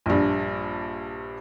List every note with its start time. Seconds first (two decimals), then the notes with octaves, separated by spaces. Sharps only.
0.06 A#1 G2